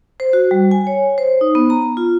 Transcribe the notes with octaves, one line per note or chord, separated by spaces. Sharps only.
C5
F#4
G3
G#5
C#5
C5
D#4
B3
A#5
F4